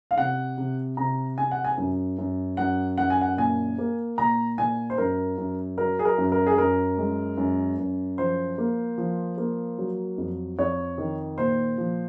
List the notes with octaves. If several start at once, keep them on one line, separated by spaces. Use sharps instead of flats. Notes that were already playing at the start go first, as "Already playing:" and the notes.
F5
C3 F#5
C3
C3 A#5
C3 G#5
F#5
G#5
F#2
F#2
F#2 F#5
F#2 F#5
G#5
F#5
A#2 G#5
A#3
A#2 A#5
A#2 G#5
C5
F#2 A#4
F#2
F#3 A#4
G#4
A#4
F#2
A#4
G#4
F#2 A#4
G#3
F#2
F#2
F3 C5
A#3
F3
A#3
F#3
F2
F2 C#5
D#3
A#2 C5
F3